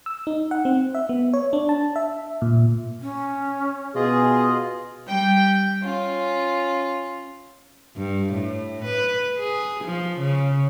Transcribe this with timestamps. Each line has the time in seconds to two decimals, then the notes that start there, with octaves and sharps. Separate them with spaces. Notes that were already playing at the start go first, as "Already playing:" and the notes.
0.06 E6
0.27 D#4
0.51 F#5
0.65 C4
0.95 E5
1.09 B3
1.34 C#5
1.53 D4
1.69 A5
1.96 E5
2.42 A#2
3.01 C#4
3.95 B2 F4 G#4 D#5
5.06 G3 G5 G6
5.81 C#4 F4
7.96 G2
8.33 A2
8.85 B4
9.39 G#4
9.84 F3
10.19 C#3